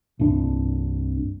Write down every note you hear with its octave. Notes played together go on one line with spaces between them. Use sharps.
C2 G2 D4